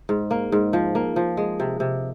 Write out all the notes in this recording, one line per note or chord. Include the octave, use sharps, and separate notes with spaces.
G#2
A#3
G#2
F3
A#3
F3
G#3
C3
C3